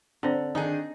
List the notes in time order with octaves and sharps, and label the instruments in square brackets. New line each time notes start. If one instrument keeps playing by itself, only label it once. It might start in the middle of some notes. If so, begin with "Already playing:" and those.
[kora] D3 [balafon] C4 C5
[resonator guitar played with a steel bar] D#3 D4 G#4 [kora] D#4